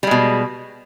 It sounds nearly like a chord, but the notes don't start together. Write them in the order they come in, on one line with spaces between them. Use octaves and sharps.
G3 G#3 B2